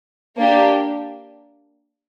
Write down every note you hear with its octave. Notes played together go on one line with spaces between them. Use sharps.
A#3 D4 G4